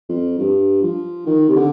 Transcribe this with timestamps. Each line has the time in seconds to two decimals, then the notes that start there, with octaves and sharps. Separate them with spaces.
0.09 F2
0.39 G2
0.82 F3
1.26 D#3
1.49 C3
1.56 D3